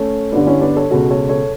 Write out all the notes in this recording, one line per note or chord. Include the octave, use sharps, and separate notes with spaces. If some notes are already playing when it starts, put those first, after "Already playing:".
Already playing: A3 C#4
G2 D3 B3 D4
C#4 E4
B3 D4
A4 C#5
C#2 B2 F#4 A4
A4 C#5
A4 C#5